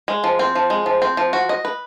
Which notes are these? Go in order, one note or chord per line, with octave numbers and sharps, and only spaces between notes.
G#3
F3
C4
F3
G#3
F3
C4
F3
F#4
D#5
B4